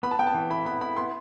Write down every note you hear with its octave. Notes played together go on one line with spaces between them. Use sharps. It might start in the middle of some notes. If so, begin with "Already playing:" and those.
B3 B5
A5
B3 G5
A5
E3
E4 B5
B3 B5
E4 B5
B3 C6